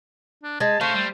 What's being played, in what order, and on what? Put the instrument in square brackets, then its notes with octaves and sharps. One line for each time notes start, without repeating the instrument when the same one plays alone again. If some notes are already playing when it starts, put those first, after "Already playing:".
[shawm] D4
[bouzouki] G#3 [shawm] A5
[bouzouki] A3 [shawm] C5 [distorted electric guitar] C#5 F5
[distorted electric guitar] G3